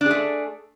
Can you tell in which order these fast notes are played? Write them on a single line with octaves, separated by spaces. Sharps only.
D4 G#4 A3